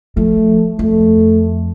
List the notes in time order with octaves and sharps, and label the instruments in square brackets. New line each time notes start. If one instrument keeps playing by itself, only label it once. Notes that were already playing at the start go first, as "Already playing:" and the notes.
[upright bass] F3 [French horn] A3
[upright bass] F2 [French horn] A3